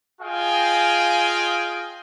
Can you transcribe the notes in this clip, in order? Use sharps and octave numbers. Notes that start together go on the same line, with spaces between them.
F4 G#4 D#5 F5 G5 G#5